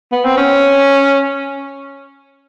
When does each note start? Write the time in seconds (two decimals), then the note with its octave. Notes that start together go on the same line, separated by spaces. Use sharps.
0.12 B3
0.25 C4
0.37 C#4